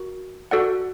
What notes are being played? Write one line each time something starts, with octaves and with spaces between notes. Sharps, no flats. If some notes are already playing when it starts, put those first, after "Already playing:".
Already playing: F#4 A#4
F#4 A4 D5 F#5